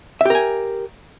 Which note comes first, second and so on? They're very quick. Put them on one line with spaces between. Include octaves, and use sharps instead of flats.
E5 G4 A#4 G#5